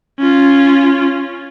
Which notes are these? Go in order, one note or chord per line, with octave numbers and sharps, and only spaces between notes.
C#4 F4